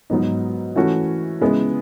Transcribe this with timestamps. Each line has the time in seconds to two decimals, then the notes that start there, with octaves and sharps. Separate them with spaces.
0.10 G#2 F#3 B3 D#4
0.76 E3 A3 C#4 F#4
1.41 C#3 G#3 B3 E4